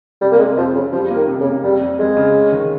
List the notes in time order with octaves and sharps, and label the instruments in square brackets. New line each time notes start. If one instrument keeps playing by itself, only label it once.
[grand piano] C3 [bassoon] G3
[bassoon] A#3
[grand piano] C3 [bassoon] G#3
[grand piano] F2 [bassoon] F3
[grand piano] F2 [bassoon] C#3
[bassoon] F3 [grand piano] G3
[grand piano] A#3
[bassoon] D#3
[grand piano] C3
[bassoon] C#3
[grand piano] A#3
[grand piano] F2 [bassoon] G3
[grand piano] F2
[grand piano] F2 [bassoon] G#3
[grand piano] C#3
C#4
D#3